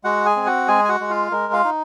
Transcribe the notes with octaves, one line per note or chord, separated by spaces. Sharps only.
G#3 F#4 F#5
G#4 G#5
C4
F#4 F#5
G#3 G#4 G#5
G#5
F#4 F#5
G#3
F4 F5
G#3 A#4
F4 F5
D#4